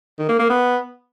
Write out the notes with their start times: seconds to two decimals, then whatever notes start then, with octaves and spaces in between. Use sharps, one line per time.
0.19 D#3
0.29 A#3
0.39 A#3
0.49 B3